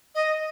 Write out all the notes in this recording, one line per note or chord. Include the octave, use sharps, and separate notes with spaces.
D#5